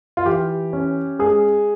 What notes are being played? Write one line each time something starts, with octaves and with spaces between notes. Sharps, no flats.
F4
E3 G4
C#4
G#3 G#4